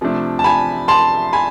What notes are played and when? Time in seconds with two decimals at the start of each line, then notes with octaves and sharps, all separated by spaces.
0.01 C3 F3 A3 D4
0.39 A5
0.44 G#5 B5
0.88 A5 C6
1.33 G#5 B5